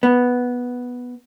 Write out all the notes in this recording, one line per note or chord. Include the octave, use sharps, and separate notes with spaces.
B3